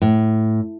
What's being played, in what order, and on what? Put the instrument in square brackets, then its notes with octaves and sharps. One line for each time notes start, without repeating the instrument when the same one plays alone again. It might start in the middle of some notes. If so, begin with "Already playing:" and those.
[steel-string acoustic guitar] A2